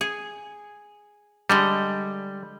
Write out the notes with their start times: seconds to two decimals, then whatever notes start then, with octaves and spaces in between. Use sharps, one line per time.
0.01 G#4
1.50 D3 G3 G#3 D#5